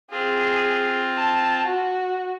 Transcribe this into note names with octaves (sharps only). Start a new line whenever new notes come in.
C4 F4 G#4
A5
F#4